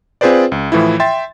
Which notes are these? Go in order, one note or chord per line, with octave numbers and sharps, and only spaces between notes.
C4 F4 G#4 B4 C5 D5
C#2
A2 E3 F3 E4
E5 G5 C6 A6